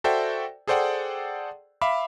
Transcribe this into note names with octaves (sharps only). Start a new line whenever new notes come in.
F#4 A4 C5 D5 E5 G5
G#4 A4 C5 D5 F#5 G5
E5 F5 B5 D6